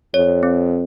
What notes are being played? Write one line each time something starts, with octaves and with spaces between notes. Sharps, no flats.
F2 C#5
C4